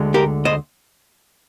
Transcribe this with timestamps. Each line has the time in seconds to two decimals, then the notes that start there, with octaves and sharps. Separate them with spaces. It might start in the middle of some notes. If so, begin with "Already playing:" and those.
Already playing: D2 D3 G#3
0.14 G4 A#4
0.45 C5 D#5